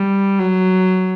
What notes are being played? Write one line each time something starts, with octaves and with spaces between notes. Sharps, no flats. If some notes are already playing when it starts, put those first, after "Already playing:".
Already playing: G3
F#3